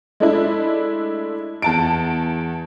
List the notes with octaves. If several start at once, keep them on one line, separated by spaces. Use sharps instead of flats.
G#3 A3 D4 E4
E2 A5 D7